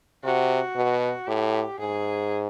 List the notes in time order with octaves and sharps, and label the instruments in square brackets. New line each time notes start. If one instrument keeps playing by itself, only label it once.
[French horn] C3 [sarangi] F#4
[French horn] B2
[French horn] A2 [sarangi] G4
[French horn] G#2 [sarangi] G#4